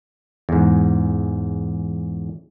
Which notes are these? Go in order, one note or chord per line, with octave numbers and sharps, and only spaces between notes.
E2 G#2